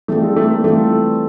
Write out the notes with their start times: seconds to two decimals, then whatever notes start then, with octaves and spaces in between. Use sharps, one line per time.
0.08 E3 G3 A3 C4 F4 A4
0.23 G#3
0.37 A3
0.50 A#3
0.64 E3 G3 A3 C4 F4 A4